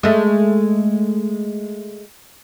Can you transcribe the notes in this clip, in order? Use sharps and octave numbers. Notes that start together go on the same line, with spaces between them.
G#3 A3